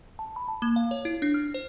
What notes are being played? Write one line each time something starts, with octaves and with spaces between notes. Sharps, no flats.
A5
B5
A5
A#3
F5
C#5
E4
D4
F6
C5